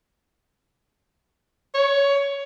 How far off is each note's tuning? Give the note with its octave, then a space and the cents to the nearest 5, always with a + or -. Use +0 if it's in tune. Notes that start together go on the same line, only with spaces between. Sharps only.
C#5 +15